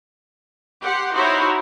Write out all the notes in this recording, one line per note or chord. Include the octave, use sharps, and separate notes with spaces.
G4 F#5 C6
D#4 E4 F#4 C5 C#5